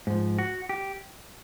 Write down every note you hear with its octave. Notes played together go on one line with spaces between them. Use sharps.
G#2 F3
F#4
G4